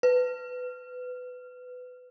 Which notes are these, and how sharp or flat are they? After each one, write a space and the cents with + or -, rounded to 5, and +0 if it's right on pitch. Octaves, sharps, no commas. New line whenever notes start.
B4 +20